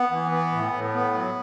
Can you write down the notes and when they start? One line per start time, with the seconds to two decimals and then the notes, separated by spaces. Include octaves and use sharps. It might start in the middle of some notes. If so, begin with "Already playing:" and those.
Already playing: B3
0.11 E3
0.31 B3
0.52 A2
0.73 A2
0.94 B3
1.14 F#3